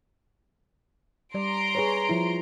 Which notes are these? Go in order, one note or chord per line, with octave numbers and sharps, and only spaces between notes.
G3 D5 A#5 C6 D7
G#4 B4 C#5
F3 E4